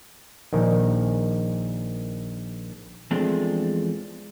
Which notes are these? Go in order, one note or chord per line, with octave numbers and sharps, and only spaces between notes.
A#1 D#3
E2 F3 G#3 A3 C4 D4